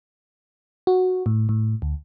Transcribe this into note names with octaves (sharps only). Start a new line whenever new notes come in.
F#4
A2
A2
D2